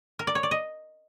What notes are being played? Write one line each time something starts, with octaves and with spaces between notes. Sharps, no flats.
A#4
D5
C#5
D5
D#5